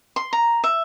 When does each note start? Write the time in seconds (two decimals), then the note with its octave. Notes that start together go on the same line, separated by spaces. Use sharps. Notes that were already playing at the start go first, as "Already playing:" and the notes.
0.16 C6
0.33 A#5
0.64 E5